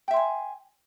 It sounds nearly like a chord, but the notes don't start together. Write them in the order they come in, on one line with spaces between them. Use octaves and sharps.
G5 E5 C6 G#5